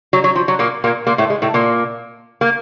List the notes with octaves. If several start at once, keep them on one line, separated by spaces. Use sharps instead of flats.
F#3
F#3
F3
F#3
A#2 A#3
A#2 A#3
A#2 A#3
A2 A3
G#3
A2 A3
A#2 A#3
A#3